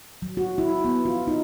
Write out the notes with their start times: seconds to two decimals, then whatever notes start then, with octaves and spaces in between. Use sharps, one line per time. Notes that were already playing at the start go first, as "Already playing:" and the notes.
0.22 F#3
0.37 F#4
0.58 E4
0.85 B3
1.05 F4
1.28 D#4